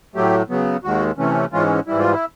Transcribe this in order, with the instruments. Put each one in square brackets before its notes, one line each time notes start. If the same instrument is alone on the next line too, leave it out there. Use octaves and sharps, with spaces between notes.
[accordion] A2 F#3 A3 G4
C#3 F#3 B3
D#2 D#3 G#3 F#4
C3 E3 A3 C#4
G#2 E3 G#3 C#4 F4
G#2 E3 G3 E4
F4
E4